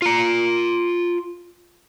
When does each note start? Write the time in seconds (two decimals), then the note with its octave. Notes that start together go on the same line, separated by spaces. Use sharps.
0.02 F4 A#5